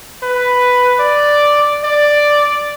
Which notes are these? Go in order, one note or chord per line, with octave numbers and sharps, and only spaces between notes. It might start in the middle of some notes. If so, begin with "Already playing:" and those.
B4
D5
D5